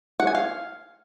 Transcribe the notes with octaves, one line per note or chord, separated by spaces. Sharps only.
F#5
G#5
F5